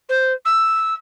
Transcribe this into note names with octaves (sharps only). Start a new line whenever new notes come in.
C5
E6